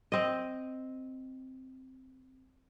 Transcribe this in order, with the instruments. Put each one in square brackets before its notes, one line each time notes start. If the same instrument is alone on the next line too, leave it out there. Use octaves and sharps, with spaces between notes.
[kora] C4 D#5